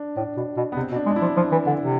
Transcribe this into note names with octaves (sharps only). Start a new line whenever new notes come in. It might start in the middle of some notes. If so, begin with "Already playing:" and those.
Already playing: D4
A2 D4
B2
B2
B3
C3 C4
B2
D4
G#3
D4
E4
F3
F3 D4
E3
D3
C3